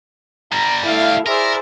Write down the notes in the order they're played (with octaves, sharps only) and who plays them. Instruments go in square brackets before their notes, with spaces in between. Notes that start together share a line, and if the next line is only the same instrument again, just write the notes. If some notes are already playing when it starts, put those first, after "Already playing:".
[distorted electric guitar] D3 G3 [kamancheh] A#5
[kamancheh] A3 E4 [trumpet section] F5
[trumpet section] E4 D5 E5 [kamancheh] G#4 C5 [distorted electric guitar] A#4